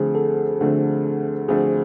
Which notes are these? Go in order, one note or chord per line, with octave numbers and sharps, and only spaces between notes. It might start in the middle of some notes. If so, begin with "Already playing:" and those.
Already playing: D2 D3 F3 A3 C4 G#4
A4
D2 D3 F3 A3 C4
D2 D3 F3 A3 C4 G#4